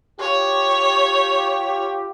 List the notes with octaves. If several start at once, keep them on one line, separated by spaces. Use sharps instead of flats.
F4 G4 C#5